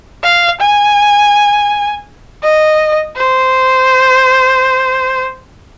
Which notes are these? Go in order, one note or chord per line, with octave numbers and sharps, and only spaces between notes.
F5
G#5
D#5
C5